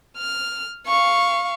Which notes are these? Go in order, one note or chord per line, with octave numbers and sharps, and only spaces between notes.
F6
F5 C#6